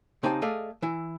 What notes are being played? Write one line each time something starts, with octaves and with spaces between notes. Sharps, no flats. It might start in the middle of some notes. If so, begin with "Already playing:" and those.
C#3 C4 D#4 G4 D#5 A5
A3 G#4 A4 D5 D#5 F5
E3 E4